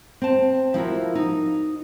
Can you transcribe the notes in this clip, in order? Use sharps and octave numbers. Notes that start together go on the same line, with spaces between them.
C4 A5
F3 E4 F#4 A#4
D#4